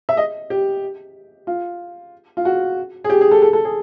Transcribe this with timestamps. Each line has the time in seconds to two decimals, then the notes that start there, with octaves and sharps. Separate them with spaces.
0.09 E5
0.17 D#5
0.50 G4
1.47 F4
2.37 F4
2.45 F#4
3.04 G#4
3.10 G4
3.21 G#4
3.31 A4
3.42 A4
3.53 A4
3.65 G#4